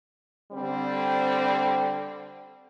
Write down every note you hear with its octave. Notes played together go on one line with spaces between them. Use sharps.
D3 G3 C4